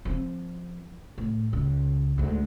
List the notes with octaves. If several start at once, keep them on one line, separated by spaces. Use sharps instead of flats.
F3 C4
A2
C#2 C#3
D2 G#2